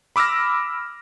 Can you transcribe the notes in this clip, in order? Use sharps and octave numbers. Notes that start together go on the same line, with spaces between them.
B5 D6 E6 F6 A#6